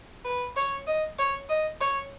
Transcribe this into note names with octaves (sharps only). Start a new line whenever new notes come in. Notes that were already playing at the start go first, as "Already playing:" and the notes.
B4
C#5
D#5
C#5
D#5
C#5